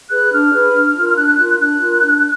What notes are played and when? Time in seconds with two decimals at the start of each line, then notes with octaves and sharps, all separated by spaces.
0.10 G#4 B4 F#6
0.32 D4 F6
0.53 G#4 B4
0.74 D4
0.95 F4 A#4
1.09 F6
1.17 D4 F#6
1.28 F#6
1.38 F4 A#4 F#6
1.49 F#6
1.60 D4 F#6
1.81 F4 A#4
2.02 D4